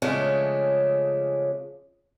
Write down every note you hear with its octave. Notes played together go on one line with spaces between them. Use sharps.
C#3 F3 G#3 A3 C#4 D4